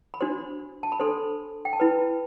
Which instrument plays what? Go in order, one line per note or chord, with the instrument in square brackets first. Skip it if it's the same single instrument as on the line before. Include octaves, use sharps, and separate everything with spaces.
[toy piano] B5
D4 F#4 C5 C6
A5
B5
D4 A4 C5 C6
G5
A5
E4 B4 B5